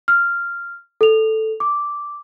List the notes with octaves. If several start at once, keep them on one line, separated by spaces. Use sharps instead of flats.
F6
A4 F7
D6